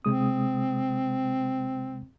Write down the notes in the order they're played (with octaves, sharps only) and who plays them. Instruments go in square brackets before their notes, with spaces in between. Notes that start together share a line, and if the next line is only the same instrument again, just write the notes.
[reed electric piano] C3 G#3 D#6 [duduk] C4